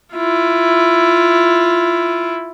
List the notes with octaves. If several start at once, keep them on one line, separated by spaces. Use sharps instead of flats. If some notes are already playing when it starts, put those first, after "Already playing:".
E4 F4